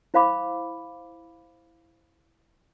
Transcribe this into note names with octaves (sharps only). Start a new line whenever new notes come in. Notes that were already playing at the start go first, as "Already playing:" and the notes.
E4 C5 F5 B5 D6